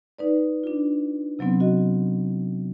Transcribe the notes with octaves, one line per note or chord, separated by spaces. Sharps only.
D#4 B4 D5
D4 F4
C3 F#3 B3 C4
F#4 D#5